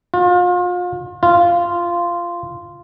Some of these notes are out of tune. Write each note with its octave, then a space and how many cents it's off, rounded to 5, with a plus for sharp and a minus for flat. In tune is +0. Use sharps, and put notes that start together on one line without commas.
F4 +35
F4 -10